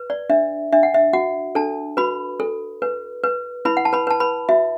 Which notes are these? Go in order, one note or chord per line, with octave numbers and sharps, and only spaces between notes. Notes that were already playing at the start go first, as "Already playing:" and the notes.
Already playing: B4
D5
D4 E5
D4 E5
F#5
E5
F#4 F#5
D4 A4 A5
F#4 B4 B5
A4
B4
B4
E4 B4 B5
F#5
A5
B4 B5
B4 A5
B4 B5
F#4 E5